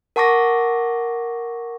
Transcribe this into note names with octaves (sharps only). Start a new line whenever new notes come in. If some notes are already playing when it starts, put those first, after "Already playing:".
A#4 F#5 A5 C#6 D6 A#6